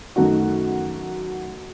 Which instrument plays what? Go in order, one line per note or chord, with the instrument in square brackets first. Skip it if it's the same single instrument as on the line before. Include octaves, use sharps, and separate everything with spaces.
[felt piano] F#2 D#3 A3 D#4 F#4